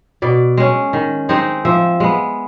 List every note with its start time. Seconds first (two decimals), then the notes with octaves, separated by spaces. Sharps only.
0.22 B2 D5
0.57 G#3 C#4
0.93 D#3
1.29 G#3 C4 D#4
1.65 F3 E5
2.00 G#3 B3